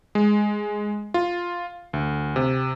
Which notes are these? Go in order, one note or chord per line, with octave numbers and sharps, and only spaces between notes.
G#3
F4
D2
C3